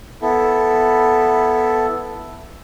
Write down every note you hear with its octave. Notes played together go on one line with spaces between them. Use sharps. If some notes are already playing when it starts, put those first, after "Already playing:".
B3 E4 A4